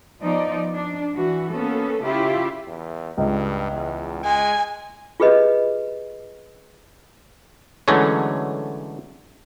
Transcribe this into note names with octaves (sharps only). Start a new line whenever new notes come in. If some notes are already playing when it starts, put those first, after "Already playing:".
F3 B3 D#4 D5
D4
E3 F#4
A#3 B3 C#4 A4
C#3 E4 F4 G4 E5
E2
C#2 G2
E2
G#3 G#5
F4 G4 G#4 B4 D#5
D3 E3 F#3 G#3 A3 C#4